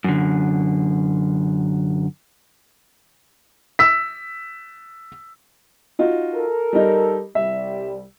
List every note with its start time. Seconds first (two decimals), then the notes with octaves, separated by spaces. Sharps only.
0.04 F#2 D3
3.79 E6 B6
5.99 D#4 F4 F#4
6.35 A4 A#4
6.73 G3 D#4
7.35 C2 G3 E5